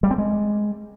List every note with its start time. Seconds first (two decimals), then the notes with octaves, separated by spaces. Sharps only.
0.03 G3
0.11 C4
0.18 G#3